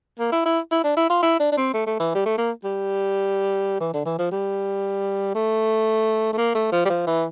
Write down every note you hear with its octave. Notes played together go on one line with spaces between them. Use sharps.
A#3
E4
E4
E4
D4
E4
F4
E4
D4
D4
C4
A3
A3
E3
G3
A3
A#3
G3
E3
D3
E3
F3
G3
A3
A3
A#3
A3
F3
G3
F3
E3